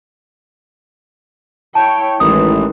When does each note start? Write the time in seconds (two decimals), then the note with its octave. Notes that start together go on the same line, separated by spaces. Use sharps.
1.75 E4 C#5 G5 A5
2.20 A1 D#3 E3 G#3 D#6